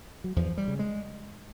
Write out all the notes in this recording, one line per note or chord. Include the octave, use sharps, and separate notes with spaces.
F#3
E2 F3
G3
C#3
G#3